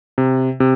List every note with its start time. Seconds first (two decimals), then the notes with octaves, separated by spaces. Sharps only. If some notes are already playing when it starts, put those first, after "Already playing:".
0.18 C3
0.60 C3